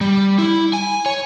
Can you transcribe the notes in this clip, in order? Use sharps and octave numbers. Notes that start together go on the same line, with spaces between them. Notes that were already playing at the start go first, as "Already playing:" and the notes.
G3
E4
G#5
C#5